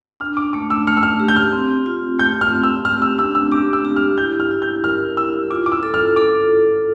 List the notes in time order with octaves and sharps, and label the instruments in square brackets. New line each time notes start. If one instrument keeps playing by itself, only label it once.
[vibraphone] D4 [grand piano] F6
[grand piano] D6
[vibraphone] A3 [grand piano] D6
[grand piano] E6
[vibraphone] A3 [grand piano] F6
[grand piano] E6
F6
[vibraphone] G4
[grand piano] G6
F6
[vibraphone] C4
F4
[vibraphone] A3 [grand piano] G6
[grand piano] F6
[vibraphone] C4
[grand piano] E6
[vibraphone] G4 [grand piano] F6
[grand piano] E6
[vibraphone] D4 [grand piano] E6
[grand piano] E6
[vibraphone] G4 [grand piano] D6
[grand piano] E6
[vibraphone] G4
[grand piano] F6
[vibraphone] E4 [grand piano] G6
[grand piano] F6
[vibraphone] E4
[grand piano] G6
[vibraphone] A#4 [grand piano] F6
[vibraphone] E4 [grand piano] E6
[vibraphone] F4 [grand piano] D6
[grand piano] D6
E6
[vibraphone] A4
[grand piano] F6
[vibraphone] A4 [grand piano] D6